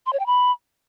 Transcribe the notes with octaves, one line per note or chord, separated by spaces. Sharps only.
C6
C#5
G5
B5